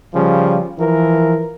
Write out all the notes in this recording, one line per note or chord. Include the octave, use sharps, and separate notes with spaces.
C#3 F3 G3
E3 F3 A#4